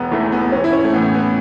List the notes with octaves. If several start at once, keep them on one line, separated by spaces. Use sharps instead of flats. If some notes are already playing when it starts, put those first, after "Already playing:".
Already playing: E1 B3
E2 E3 A3
B3
A1 C#4
E4
C#4
A3
A2 E3 B3
B3